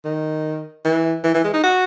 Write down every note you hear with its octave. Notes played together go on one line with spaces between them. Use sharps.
D#3
E3
E3
E3
G#3
D#4
F#4